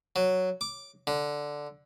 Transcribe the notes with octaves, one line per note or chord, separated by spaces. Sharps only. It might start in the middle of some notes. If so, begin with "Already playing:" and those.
F#3
D6
D3